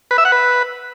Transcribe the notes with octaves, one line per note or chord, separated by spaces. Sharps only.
B4
E5
F#5
B4